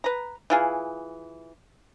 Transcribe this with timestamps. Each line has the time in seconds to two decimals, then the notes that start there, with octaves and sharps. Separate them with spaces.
0.04 B4 A#5
0.50 E3 F4 G#4